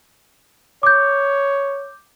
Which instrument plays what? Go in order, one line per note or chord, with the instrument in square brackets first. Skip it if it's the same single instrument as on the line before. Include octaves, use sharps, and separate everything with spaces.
[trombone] C#5 [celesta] D6 G6